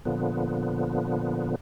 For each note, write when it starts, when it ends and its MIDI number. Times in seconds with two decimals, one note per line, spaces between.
0.05 1.55 46
0.05 1.55 50
0.05 1.55 53
0.05 1.55 59